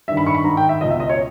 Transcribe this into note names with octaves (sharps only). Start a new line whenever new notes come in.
G2 D#3 E5
B5
C#6
B5
G#2 D#3 A#5
G5
E5
C#2 B2 D#5
E5
D#5
C#5